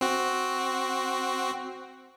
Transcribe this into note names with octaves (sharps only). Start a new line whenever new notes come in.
C4 F#4